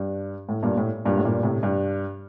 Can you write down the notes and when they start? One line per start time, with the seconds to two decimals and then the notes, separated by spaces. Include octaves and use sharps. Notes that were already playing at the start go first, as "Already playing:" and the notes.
Already playing: G2
0.49 A2
0.63 G2 A#2
0.77 A2
1.05 G2 A#2
1.17 A2
1.25 G2 A#2
1.43 A2 C3
1.63 G2